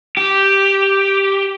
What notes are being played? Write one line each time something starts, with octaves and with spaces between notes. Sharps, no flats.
G4